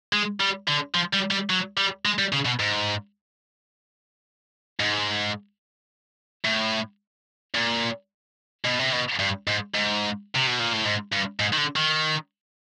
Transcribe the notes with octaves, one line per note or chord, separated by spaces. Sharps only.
G#3
G3
D3
F3
G3
G3
F#3
G3
G#3
G3
C#3
B2
G#2
G#2
A2
A#2
B2
C3
B2
G2
G#2
G#2
C3
B2
A#2
A2
G#2
G2
G#2
D#3
D3
D#3